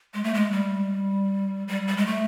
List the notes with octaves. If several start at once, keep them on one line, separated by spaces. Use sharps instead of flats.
G#3
A3
G#3
G3
G3
G3
G#3
A3